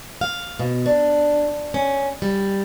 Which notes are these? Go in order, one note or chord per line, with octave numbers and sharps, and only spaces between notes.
F5
B2
D4
C#4
G3